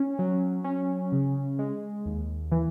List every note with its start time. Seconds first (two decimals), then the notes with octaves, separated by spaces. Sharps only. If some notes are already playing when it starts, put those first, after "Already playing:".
Already playing: C#4
0.19 F#3
0.64 C#4
1.12 C#3
1.59 G#3
2.06 D#2
2.52 E3